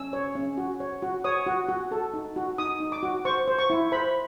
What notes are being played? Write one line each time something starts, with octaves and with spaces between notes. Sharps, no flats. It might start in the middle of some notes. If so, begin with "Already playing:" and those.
Already playing: C#4 E6
C#5
C#4
F#4
C#5
F#4
C#5 D#6
F#4
F#4
A4
D#4
F#4
D#4 D#6
D#4
D6
F#4
C5 C#6
C5
C#6
E4
C5 B5